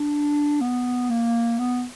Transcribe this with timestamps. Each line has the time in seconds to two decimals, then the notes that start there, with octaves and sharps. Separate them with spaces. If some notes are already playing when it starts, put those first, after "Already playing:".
Already playing: D4
0.61 B3
1.10 A#3
1.59 B3